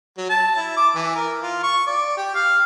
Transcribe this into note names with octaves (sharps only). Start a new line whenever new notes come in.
F#3
A5
E4
D6
E3
A#4
F4
C#6
D5
G4
F5